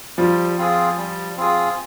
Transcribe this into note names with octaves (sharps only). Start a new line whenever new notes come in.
F3 G3
C4 F4 G#4
G3
C4 F4 G#4